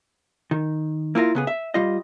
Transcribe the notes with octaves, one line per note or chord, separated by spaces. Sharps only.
D#3
A#3 E4 F4 A#4
C#3 B3 G#4
E5
G3 F4 D#5